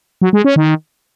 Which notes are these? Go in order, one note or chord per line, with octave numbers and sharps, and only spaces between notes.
F#3
G#3
C#4
D#3